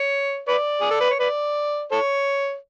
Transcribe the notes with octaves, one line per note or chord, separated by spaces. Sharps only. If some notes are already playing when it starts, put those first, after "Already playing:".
Already playing: C#5
B4 D5
G#4
A4
B4
C#5
B4 D5
A4 C#5